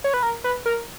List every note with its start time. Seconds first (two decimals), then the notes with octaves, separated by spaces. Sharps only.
0.04 C#5
0.14 B4
0.23 A#4
0.44 B4
0.66 A#4